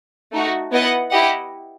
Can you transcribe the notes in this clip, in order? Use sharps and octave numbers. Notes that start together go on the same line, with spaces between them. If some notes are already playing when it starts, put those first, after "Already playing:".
A3 D#4 F#4
B3 E4 B4 D#5 F#5
E4 G4 D#5 F#5